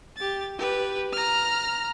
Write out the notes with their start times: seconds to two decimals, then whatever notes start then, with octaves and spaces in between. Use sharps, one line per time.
0.17 G4 A6
0.59 G4 B4
1.13 A#5 F6